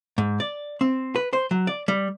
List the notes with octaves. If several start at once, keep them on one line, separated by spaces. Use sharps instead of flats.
G#2
D5
C4
B4
C5
F#3
D5
G3